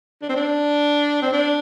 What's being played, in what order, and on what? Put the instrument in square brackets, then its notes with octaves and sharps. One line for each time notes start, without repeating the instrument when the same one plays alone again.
[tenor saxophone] D4
C4
D4
C4
D4